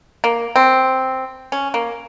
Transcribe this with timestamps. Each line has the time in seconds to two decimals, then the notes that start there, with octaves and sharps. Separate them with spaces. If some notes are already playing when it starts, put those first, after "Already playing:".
0.24 A#3
0.56 C4
1.52 C#4
1.74 A#3